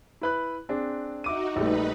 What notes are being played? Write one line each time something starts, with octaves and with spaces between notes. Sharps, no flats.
E4 B4 F#6
C4 D4 G#4
D#4 F#4 E5 D6 D#7
A#1 G3 A3 D#4 B4